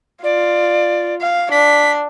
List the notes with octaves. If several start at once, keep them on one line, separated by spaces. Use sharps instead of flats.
F4 D5
F5
D4 B6